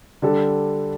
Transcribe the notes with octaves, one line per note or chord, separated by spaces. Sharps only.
D3 G3 D4 A4